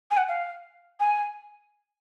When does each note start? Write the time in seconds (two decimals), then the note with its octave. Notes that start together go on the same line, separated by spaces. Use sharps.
0.11 G#5
0.17 F#5
0.29 F5
1.00 G#5